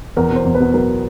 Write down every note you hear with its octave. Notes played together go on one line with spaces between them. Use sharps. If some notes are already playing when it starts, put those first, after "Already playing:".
E2 A#4
B2
C5
E2
B4
B2
F#3 A#4